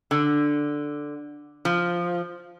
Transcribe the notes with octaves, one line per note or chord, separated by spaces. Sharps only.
D3
F3